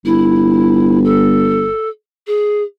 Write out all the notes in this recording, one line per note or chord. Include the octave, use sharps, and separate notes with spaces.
G1 E4
A4
G#4